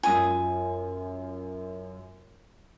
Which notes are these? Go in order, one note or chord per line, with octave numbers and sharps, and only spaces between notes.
F#2 F4 G#5 D#6